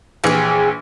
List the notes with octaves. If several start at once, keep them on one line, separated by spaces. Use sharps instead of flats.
A#1 E3 G4 G#4